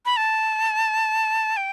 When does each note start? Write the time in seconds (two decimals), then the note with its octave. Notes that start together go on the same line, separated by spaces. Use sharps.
0.06 B5
0.17 A5
1.57 G5